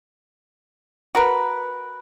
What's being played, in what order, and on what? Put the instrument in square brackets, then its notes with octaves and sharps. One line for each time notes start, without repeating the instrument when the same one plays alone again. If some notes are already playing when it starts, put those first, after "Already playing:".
[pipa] F#4 A#4 B4